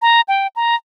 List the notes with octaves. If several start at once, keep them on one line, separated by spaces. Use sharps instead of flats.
A#5
G5
A#5